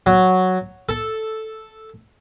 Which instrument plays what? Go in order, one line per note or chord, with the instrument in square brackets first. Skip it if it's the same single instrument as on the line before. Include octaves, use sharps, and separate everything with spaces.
[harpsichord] F#3
A4